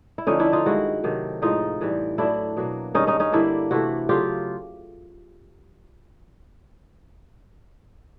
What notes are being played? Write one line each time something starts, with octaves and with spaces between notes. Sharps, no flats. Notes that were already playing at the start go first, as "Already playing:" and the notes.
E4
D3 F3 A3 C#4 D#4
D4 E4
D#4 F4
G2 D#3 G#3 E4 F#4
C3 D#3 F#3 A3
A2 F3 G#3 D#4 F4
A2 E3 G3
A2 F#3 A3 D4 E4
B2 F#3 A#3
G2 D#3 G#3 C#4 D#4
C#4 D#4
C#4 D#4
D3 G3 A#3 D4 E4
C3 E3 A3 E4 F#4
C#3 F#3 A3 F4 G4